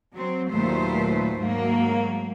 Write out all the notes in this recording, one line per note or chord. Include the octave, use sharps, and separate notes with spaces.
F#3 C4
D#2 A#2 F#3 A3 B4 C5
G#2 F#3 A3 A#3